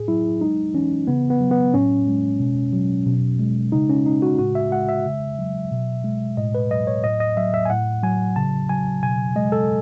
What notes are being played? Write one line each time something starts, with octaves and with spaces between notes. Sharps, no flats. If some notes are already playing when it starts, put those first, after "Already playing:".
Already playing: A2 G#4
F#3 E4
G#3 D#4
E3 C#4
C#3 B3
B3
F#3
B3
A2 C#4
G#3
B2
F#3
B2
G#3
C#3 D#4
C#4
G#3 D#4
F#4
A2 F#4
E5
G#3 F#5
E5
C#3
F#3
B2
G#3
A2 D#5
B4
F#3 D#5
C#5
A2 D#5
D#5
F#3 E5
E5
G#5
A2 F#5
F#3 G#5
C#3 A5
F#3 G#5
B2 G#5
G#3 D#5
A4